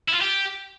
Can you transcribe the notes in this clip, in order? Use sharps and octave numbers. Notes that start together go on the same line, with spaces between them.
E4
F4
G4